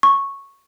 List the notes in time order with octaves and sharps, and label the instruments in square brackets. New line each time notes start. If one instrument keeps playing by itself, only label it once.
[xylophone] C#6